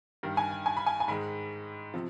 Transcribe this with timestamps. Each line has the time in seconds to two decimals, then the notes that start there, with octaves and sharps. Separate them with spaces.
0.23 G2 D#3 G3
0.37 G#5
0.51 G5
0.66 G#5
0.77 B5
0.86 G#5
1.00 G#5
1.08 G#2 D#3 G#3 B5
1.94 C3 F3